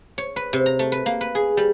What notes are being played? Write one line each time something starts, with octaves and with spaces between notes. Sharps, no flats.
C#5
B4
C3
A#5
A3
B4
A#3
B4
G#4
G3